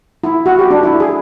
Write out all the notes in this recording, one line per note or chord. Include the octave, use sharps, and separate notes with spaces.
E4
F#4
G4
D4
E4
G#4